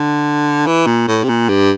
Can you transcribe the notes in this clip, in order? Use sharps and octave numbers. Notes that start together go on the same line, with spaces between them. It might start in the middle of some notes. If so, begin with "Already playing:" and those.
Already playing: D3
E3
A#2
A2
C3
A#2
G2